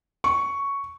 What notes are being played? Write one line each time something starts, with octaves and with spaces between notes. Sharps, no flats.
C#6